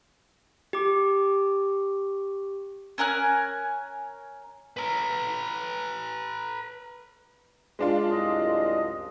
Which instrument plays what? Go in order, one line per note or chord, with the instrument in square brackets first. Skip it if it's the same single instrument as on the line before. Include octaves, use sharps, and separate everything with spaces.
[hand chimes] G4 D6
[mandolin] C#4 A#4 G#5 F#6
[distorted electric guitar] B4 A#5
[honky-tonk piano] G#3 D4 F4
[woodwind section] C2 F#2 D#5